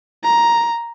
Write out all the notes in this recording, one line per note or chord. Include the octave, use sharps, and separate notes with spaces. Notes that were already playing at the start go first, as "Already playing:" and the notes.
A#5